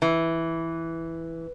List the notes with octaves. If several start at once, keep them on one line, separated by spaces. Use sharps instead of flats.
E3